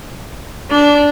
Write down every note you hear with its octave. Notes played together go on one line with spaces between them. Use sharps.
D4